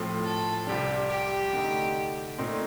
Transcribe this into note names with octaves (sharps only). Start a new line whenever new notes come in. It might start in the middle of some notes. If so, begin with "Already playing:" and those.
Already playing: A2 F3 A3 C4
A4
C2 C3 G3 D4 G4
G4
D3 A3 D#4
A#2 A3 C4 D#4